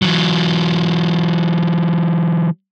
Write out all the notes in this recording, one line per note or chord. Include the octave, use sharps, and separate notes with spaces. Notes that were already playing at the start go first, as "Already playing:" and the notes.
E3 F#3